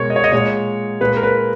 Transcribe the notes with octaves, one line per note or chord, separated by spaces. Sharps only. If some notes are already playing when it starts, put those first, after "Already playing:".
Already playing: B2 G#3 A#4 C#5
D#5
C#5
D#5
A#2 G#3 C#5
A#2 G#3 B4
A#4
B4